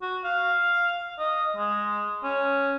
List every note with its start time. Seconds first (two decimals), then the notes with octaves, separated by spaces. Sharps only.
0.02 F#4
0.24 F5
1.19 D#5
1.56 G#3
2.23 C#4